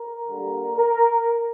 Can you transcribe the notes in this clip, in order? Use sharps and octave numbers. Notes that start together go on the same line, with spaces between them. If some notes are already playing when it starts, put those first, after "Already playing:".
Already playing: A#4
D3 G3 A#3
A#4